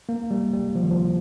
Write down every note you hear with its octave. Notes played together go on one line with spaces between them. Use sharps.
A#3
G3
G3
F3
D#3
F3